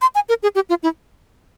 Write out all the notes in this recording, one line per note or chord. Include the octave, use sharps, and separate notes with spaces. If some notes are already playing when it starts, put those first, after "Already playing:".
C6
G#5
A#4
G#4
G4
F4
E4